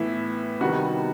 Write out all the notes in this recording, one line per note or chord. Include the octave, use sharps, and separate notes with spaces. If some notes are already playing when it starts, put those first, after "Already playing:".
Already playing: A2 E3 B3 E4
C3 D#3 G3 B3 F#4